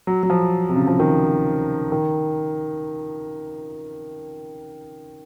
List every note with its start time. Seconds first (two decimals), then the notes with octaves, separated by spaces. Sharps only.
0.07 F#3
0.23 F#3
0.30 F3
0.69 C3
0.76 C#3
0.87 F3
1.00 D#3
1.92 D#3